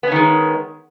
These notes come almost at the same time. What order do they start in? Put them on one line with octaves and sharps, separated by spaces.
B3 C#4 D#3 G#3